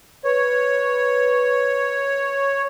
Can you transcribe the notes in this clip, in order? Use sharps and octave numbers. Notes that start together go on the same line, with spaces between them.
B4 C#5